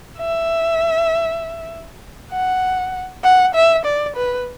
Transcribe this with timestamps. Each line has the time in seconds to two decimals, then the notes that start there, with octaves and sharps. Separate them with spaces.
0.18 E5
2.32 F#5
3.24 F#5
3.55 E5
3.85 D5
4.16 B4